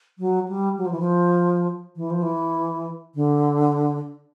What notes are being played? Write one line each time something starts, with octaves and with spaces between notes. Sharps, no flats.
F#3
G3
F#3
F3
E3
F3
E3
F3
E3
D3